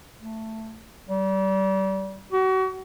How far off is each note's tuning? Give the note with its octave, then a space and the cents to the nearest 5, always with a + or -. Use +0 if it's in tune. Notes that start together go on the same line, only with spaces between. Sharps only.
A3 +10
G3 -30
F#4 +35